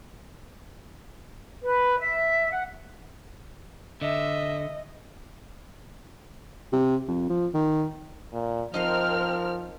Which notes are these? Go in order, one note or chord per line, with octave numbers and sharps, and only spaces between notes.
B4
E5
F#5
D3 D#5 E5
C3
F2
F3
D#3
A#2
F3 C4 D#4 A#4 D#5 C6 F6